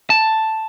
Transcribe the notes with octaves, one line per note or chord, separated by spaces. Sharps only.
A5